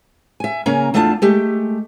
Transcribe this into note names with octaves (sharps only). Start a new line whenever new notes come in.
E5 G#5
C#3 A#3 C#4 G#5 A#5
E2 A3 D4 F4 F#5 A5
G#3 A3 G4